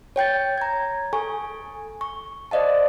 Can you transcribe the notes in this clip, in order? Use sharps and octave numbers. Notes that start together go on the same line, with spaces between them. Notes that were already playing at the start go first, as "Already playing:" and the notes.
C#5 G5 G6 A6
A#5 G#6
A4 G#5 C#6
C#6
C5 D5 D#5 F5 A5